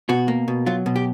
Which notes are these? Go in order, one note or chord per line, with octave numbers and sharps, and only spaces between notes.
B2 F#4
A#3
B2
F#3 F4
B2
G4